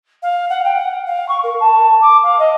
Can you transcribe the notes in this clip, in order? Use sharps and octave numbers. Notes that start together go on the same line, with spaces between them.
F5
F#5
G5
F#5
F5
C#6
A#4
A5
D6
F5
D#5